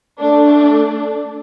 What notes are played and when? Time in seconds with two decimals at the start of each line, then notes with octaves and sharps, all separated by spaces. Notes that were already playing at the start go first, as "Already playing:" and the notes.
0.19 A3 D4